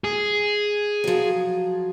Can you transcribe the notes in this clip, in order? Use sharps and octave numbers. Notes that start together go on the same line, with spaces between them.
G#4
F3 F#3